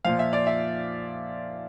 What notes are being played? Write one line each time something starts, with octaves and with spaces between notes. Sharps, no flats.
A#2 F3 F5
E5
D5
E5